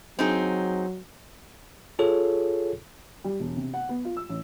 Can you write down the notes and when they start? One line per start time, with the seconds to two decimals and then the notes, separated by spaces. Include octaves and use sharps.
0.19 F#3 C4 D#4 G#4
1.99 F4 G#4 A4 C#5
3.24 G3
3.40 E1
3.57 C3
3.74 F#5
3.89 B3
4.05 F4
4.17 E6
4.29 A1